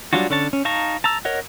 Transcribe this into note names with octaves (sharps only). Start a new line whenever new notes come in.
F#3 G3 D4 F4 F#4
D3 C#4 D4 C#5 A5
C#4
D#4 F5 A5 A#5 C#6
A5 A#5 E6
A#4 C#5 D#5 F#5